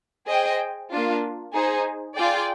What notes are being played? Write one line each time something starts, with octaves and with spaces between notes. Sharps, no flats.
G#4 C5 D#5 G5
A#3 D4 F4
D#4 G#4 C5
F4 G#4 D5 G5